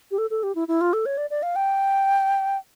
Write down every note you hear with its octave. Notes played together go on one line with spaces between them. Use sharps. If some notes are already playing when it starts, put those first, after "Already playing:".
G4
A4
A4
G4
E4
E4
F4
A4
C#5
D5
D5
F5
G5